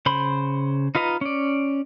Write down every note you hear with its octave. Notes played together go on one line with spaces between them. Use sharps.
C#3 C5 B5 C6
D#4 F4 B4 D#5 A#5
C#4 D5